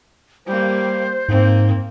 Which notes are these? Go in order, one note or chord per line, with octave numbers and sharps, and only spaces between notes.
G3 A#3 C5
G#2 A#3 C4